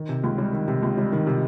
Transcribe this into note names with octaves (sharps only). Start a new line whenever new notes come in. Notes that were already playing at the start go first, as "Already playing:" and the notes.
Already playing: D#3
C3
C#2
G3
D#3
C3
C#2
G3
D#3
C3